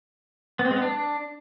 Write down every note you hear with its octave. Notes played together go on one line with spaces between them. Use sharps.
B3
C4
G#3
B3
D4